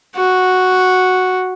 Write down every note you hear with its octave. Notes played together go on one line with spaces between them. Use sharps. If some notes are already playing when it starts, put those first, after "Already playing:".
F#4